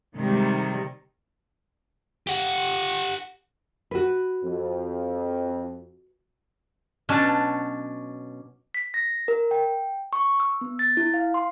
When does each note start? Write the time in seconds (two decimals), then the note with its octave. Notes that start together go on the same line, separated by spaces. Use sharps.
0.16 C3 D#3 G3 G#3
2.27 G4 F#5
3.91 F#4 B4
4.43 F2
7.09 B2 F#3 C#4 D4 A5
8.74 B6
8.94 A#6
9.28 A#4
9.51 G5
10.13 C#6
10.40 E6
10.61 B3
10.79 A6
10.97 E4
11.14 F5
11.34 C6